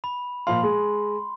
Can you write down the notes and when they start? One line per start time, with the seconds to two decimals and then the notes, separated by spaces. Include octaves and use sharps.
0.04 B5
0.47 A#2 F3 F5 C6
0.63 G#3